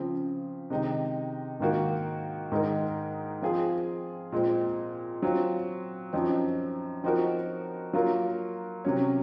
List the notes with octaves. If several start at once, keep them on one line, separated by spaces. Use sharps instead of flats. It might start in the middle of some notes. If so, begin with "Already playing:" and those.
Already playing: C#3 F3 C4
C3 D#3 G#3 D#4
G#2 D#3 A#3 D#4 F#4
G#2 D#3 G#3 D#4 A#4
F3 C4 F4 G#4
A#2 G#3 C4
F#3 C4 F4
F#2 F3 C4 D#4
F3 C4 D#4 F#4 A#4
F#3 A#3 F4 A#4
C3 F#3 C#4